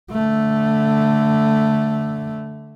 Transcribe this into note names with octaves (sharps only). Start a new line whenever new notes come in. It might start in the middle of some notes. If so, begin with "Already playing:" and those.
D3 A3